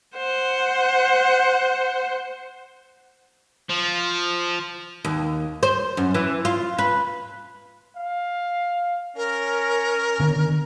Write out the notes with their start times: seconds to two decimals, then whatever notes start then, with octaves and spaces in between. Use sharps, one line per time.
0.16 C5 F#5
3.69 F3
5.04 D#2
5.63 C5
5.97 F#2
6.14 E3
6.45 F4
6.78 B4
7.97 F5
9.16 C#4 A#4
10.19 D3 D#3 B3